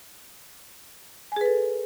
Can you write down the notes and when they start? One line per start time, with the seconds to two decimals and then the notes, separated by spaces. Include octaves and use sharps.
1.32 G#5
1.36 G#4
1.41 B4
1.46 A4